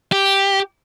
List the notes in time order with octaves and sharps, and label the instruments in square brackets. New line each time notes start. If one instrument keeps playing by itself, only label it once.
[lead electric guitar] G4